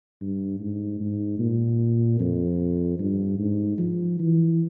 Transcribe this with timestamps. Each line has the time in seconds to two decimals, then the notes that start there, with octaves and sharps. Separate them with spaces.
0.21 G2
0.60 G#2
1.01 G#2
1.39 A#2
2.20 F2
2.99 G2
3.39 G#2
3.78 F3
4.19 E3